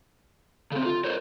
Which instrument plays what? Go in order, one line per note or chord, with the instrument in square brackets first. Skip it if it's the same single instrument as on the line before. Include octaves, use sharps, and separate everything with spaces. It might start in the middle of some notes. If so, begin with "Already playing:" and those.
[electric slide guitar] C#3 C4 [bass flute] A4
[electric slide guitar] F4
A#4 C5 C#5